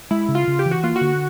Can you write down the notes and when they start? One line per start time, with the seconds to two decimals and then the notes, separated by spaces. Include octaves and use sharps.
0.11 G#3 E4
0.28 C#3
0.35 F4
0.47 C#3
0.59 G4
0.66 E3
0.71 F#4
0.83 A#3 F4
0.96 F#4
1.01 D3